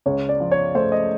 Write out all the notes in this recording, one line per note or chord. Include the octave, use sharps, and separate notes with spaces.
C#2 C#5
D5
F3
C#5
A3 C5
D#5